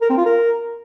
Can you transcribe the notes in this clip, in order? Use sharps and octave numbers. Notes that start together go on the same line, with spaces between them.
A#4
C4
F4
A#4